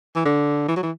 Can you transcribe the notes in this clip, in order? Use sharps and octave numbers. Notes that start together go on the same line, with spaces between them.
E3
D3
E3
F#3
E3